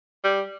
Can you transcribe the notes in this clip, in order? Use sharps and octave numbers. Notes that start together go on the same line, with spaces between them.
G3